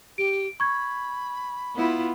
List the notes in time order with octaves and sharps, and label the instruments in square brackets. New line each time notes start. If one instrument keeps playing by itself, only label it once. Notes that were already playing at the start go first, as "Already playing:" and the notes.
[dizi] G4 [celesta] D7
[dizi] B5 [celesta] C#6 G#6
[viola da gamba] B3 E4 F4